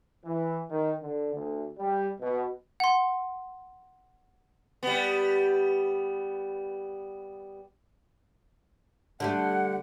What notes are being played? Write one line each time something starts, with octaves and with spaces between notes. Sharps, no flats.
E3
D#3
D3
D2
G3
B2
F#5 C6
G3 B3
D3 G3 A3 F#5